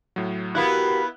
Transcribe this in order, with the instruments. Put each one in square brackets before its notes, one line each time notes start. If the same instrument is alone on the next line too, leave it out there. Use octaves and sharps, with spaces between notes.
[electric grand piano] A2 F#3
[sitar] B3 E4 [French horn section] F#4 G4 A#4 [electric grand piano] F5 F#6 [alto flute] B5